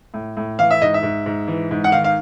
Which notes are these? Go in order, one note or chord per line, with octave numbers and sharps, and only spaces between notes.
A2
A2
E3 F5
E5
G#2 D#5
E5
G#2
G#2
E3
G#2
F#5
D#3 F5
F5